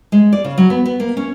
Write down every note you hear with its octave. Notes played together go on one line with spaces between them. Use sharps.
G#3
D5
C#3
F#3
B3
B3
A#3
C#4